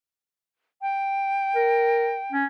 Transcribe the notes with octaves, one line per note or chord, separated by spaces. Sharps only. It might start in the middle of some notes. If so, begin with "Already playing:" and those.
G5
A#4
C#4